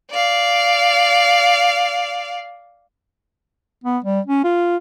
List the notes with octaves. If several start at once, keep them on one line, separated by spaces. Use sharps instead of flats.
D5 F5
B3
G3
C#4
F4